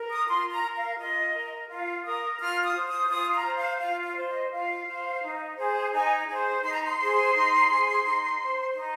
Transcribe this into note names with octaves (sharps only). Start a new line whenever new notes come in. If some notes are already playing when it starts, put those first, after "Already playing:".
Already playing: A#4
D#6
F4 C6
A#5
A#4
F5
F4 D#5
A#4
F4 F5
A#4 D#6
F4 F6
D#6
C5
D#6
F4 D#6
A#5
C5
F5
F4 F5
F5
C5
D#5
F4 F5
C5
D#4
G#4 C5
D#4 G#5
G#4 C5
D#4 C6
A#5
C6
G#4 C5
D#4
G#4 C5
D#4
C5
D#4